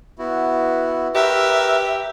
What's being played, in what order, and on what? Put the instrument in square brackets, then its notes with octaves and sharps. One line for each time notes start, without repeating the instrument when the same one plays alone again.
[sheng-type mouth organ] B3 E4 F#4
[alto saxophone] G4 [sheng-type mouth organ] A#4 B4 [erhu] E5